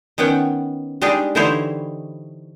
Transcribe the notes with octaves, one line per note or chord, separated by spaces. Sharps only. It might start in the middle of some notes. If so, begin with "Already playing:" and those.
D#3 B3 C#4 F#5 G5
G3 G#3 D4 D#4 G4 G#4
D3 E3 D#4 E4 C5 C#5